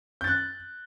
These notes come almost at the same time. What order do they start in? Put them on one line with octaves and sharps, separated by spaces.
G6 A6 F#6